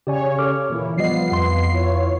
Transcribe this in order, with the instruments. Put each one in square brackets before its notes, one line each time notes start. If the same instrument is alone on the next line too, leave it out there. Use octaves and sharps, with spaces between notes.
[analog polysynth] C#3 C#5 [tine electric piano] G4 D5 G#5
[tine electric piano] A4 D6 F6
[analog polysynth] A#2 E3 E4
[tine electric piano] F3 G3 D#5 [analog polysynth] B3 F4 C7
[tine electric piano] F2 B4 C6
[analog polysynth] E4 F4 C#5